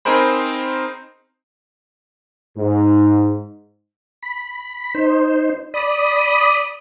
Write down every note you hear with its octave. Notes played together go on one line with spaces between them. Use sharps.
C4 D#4 G#4 A#4 C5 B5
G#2
B5
D#4 C5
D5 B5 D#6